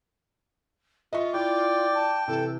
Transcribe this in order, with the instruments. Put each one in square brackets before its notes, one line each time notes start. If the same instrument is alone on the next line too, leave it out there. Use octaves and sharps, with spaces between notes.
[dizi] F4 [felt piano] D#5 E5 C#6
[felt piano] E4 [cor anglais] D5 [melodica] G5
[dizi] A5
[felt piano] C3 E3 [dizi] A4